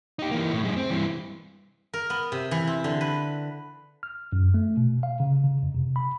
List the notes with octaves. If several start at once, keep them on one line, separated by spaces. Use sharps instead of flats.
D#4 G4
E3 A#3
A2
F#2 G#3
C4
G2 E3
A#4
B3
C3
E3
C4
D3
B4
F6
F#2
A3
B2
F5
C#3
C#3
F2
C3
B5